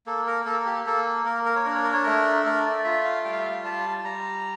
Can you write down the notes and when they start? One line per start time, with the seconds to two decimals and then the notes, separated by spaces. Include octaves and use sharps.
0.06 A#3 A4
0.27 A#4
0.46 A#3 A4
0.60 A4
0.66 G4
0.86 A#3 A4
1.25 A#3 A#4
1.46 A#4
1.56 C#5
1.65 D4 A#4
1.75 C#5
1.84 A#4
1.93 C#5
2.03 A3 A#4
2.41 A4
2.45 A3 A#4
2.66 D5
2.84 F4 E5
3.05 F5
3.24 G3 G5
3.32 F5
3.39 E5
3.45 F5
3.64 G3 A5
4.04 G3 A#5